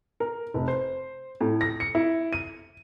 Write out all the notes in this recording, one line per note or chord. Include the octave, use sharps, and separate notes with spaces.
A#4
F1
C5
A2
A#6
C#7
E4
D#7